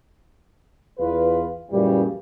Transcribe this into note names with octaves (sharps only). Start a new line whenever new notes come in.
E2 F4 B4
F#2 A#2 C#3 E3 G3